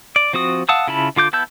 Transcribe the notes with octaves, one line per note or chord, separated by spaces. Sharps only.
D5
F3 C4 F#4 D#6
F5 F#5 A5 D#6 E6
C#3 E4 F4 A5 B5
D3 F4 D6 G6
B3 E4 A5 E6 G6